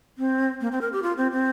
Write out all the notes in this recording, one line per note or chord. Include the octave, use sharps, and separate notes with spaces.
C4
A#3
C4
A#4
G4
F4
C4
C4